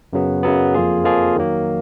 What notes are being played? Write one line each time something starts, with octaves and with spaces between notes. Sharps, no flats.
F#2 C#3 F#3 B3
F#2 C#3 F#3 B3
F2 F3 A#3 F4 G#4
F2 F3 A#3 F4 G#4
D#3 F#3 A#3